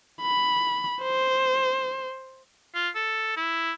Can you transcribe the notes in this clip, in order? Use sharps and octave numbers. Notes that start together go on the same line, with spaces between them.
B5
C5
F4
A4
E4